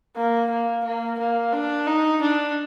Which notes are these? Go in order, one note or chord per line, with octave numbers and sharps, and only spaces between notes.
A#3
A#3
A#3
A#3
D4
D#4
D4